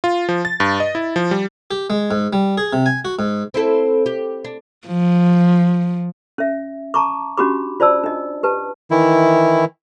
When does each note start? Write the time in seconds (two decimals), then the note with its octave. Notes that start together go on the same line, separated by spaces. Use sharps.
0.04 F4
0.29 F3
0.45 A6
0.60 G2
0.80 D#5
0.95 E4
1.16 F3
1.31 G3
1.71 G4
1.90 G#3
2.11 G#2
2.33 G3
2.58 G#4
2.73 C3
2.86 G#5
3.05 F#4
3.19 G#2
3.54 C4 E4 A4
4.06 G4
4.45 D4
4.87 F3
6.38 C#4 E5
6.94 A5 A#5 C#6 D6
7.37 C#4 D4 F#4 G4 B5 D6
7.80 F4 C5 D5 A5 E6
8.04 D4 D#5
8.43 G4 B4 A5
8.91 D#3 E3 E4